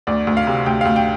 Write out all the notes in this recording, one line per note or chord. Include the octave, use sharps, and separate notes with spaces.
D2 D5
D2
F5
C3
D2 G5
F5
D2
G5